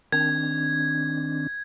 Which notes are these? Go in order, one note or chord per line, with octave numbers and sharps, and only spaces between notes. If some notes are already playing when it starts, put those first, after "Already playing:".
D#3 C4 D4 G#6